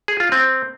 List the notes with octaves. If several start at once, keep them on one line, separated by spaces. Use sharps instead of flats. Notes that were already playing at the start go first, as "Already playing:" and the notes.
G#4
F4
C4